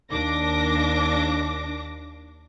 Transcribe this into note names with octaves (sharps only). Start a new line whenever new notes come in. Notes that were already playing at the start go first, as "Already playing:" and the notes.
D#2 D4 D6 A#6